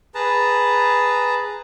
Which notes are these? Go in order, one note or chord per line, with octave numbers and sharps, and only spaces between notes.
G#4 B4 A5 A#5